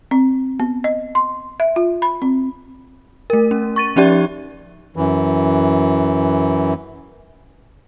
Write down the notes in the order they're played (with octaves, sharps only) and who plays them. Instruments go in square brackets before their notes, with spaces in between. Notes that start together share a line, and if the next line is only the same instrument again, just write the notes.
[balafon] C4
B3
D#5
C6
E5
F4
B5
C4
[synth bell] A3 A#4
C#4
C#6 A6 D#7
F3 C#4 D#4 G4 D5 E5
[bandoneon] F#2 E3